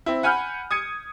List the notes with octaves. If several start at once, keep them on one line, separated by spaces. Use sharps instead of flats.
C4 E4
F#5 G#5 B5 F6 G6
D#6 G#6 C#7 D#7